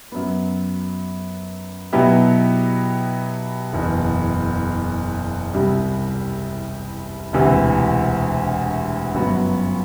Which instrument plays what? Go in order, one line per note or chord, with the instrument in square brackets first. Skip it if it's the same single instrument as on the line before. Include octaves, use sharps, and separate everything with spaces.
[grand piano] F#2 F#3 B3
B2 F#3 B3 E4 G4
F#1 E2 B2
C2 C3 G3
E1 D2 C3 E3
G1 F#2 F#3 B3 F#4